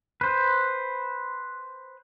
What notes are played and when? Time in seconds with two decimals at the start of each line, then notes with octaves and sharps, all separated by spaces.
0.21 B4 C5